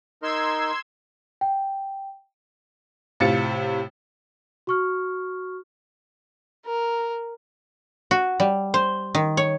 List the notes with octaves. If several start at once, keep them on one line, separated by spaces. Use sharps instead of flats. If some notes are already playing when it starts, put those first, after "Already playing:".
D#4 A#4 C6 E6 G#6
G5
A2 C3 F4 A6 C#7
F#4 C#6 F6
A#4
F#4
G3
C5
D#3
C#5